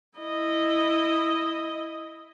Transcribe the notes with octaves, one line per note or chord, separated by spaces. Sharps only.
E4 D#5